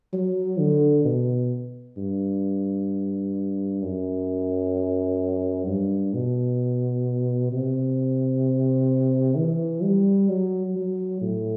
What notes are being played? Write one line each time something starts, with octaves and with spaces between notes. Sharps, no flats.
F#3
D3
B2
G2
F#2
G2
B2
C3
E3
G3
F#3
F#3
A2